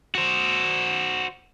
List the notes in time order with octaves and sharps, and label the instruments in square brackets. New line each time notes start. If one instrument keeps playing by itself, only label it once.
[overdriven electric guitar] F#4 C5